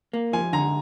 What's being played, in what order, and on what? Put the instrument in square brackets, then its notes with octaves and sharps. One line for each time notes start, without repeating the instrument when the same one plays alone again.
[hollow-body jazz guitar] A#3
[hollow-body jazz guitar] F3 [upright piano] G#5
[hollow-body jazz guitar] D3 [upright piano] A#5